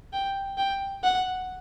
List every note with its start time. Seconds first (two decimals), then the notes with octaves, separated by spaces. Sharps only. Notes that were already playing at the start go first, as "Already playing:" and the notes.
0.13 G5
0.58 G5
1.04 F#5